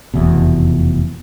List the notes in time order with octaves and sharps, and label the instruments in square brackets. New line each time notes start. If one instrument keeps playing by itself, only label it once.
[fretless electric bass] F1 E2 B2